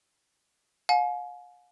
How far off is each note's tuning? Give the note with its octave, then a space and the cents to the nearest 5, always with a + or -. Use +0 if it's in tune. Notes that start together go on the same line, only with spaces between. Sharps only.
F5 +45 G#5 +35